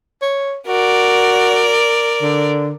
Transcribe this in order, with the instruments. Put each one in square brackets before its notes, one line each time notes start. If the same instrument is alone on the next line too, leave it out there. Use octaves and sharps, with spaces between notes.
[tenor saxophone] C#5
[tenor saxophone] F#4 [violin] A#4 D5
[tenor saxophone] D3